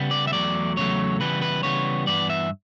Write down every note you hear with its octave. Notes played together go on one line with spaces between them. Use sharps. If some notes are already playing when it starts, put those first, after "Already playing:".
Already playing: C#3 G3 B3
D5
E5
E2 C#3 F#3 A3 D5
E2 C#3 F#3 A3 C#5
C#3 E3 G3 B3 B4
B4
C#3 E3 G3 B3 C#5
G2 E3 B3 D5
E5